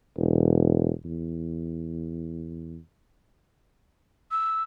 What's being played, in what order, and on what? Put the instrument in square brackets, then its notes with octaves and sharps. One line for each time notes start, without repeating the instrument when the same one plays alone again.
[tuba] E1
E2
[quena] E6